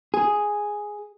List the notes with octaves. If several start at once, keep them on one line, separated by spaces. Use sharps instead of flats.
G#4